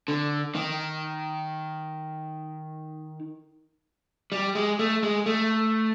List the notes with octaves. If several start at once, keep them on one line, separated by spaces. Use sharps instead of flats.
D3
D#3
G3
G#3
A3
G#3
A3